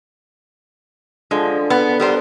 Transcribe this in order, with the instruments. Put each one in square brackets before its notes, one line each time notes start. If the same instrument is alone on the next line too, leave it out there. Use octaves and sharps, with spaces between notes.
[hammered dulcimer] D3 F3 [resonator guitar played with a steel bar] G#3
[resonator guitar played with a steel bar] B3
[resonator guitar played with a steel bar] G3 A#4 C5 [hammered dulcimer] B3